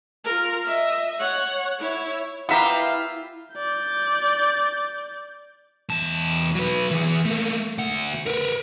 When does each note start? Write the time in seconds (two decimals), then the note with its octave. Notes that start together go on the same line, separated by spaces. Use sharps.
0.24 F4 A#4
0.65 D#5 E5
1.19 C#5 F#5
1.79 E4 C#5
2.49 B3 E4 F4 G4 B4 E5 F5 A#5
3.55 D5 G6
5.89 E2 A5
6.55 F#3 B4
6.91 E3 G#4
7.25 A3 A#3
7.78 D2 F#5
8.26 A#4 B4